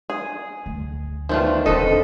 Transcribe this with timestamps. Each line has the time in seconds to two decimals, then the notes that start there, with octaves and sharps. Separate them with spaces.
0.10 G#4
0.66 D2
1.29 D#3 F3 A3 B3 D4 F4
1.66 E1 A#2 D3 D#3 C4 A4 B4 D#5